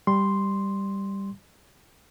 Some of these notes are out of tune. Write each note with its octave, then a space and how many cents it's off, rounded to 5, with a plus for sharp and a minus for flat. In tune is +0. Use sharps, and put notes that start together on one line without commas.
G3 +0 C6 +0